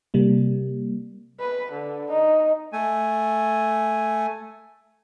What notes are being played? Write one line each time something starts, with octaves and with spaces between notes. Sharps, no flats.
C3 G3 A#3
B4
D3
D#4
A3 G#5